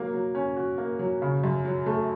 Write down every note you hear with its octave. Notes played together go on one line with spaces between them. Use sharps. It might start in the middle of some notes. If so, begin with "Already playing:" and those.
Already playing: F#3 A#3
F#3
C#4
F#4
A#3
F#3
C#3
F#2
F#3
A3